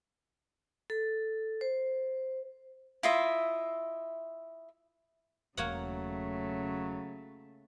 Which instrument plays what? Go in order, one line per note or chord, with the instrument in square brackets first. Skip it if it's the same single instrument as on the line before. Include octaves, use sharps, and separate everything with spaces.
[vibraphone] A4
C5
[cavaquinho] E4 F4 D#5 E5
[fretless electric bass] E1 [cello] C#3 A3 [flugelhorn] F#3 [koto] A#3 C#5 F#5